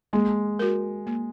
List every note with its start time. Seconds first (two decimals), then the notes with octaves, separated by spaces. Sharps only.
0.13 G#3 A#3
0.59 F#4 A#4
1.07 A#3